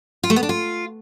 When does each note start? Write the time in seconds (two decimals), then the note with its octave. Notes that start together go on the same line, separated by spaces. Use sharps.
0.23 F4
0.30 A3
0.36 B3
0.43 D4
0.49 F4